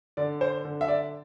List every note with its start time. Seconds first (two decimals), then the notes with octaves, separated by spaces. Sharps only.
0.17 D3 D5
0.41 C5
0.65 D3
0.81 E5
0.88 D5